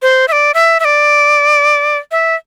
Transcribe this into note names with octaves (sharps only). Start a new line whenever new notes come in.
C5
E5
D5
E5
E5
D5
E5